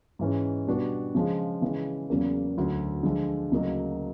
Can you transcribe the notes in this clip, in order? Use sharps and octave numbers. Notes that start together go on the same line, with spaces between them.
G#2 E3 G#3 C#4
B2 G3 B3 D4 F#4
C#3 F3 G#3
C#3 E3 G#3
E2 C#3 F#3 A#3 C#4
D2 D3 F#3
D3 F3 G#3
D2 C#3 F#3 A#3 D#4